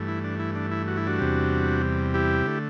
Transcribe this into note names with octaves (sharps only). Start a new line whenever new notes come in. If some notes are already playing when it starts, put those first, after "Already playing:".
Already playing: G2 E3 A3
E4
D4
E4
D4
E4
F#4
E4
D4 F#4
E2 C3 G3
E4 G4
D3 A3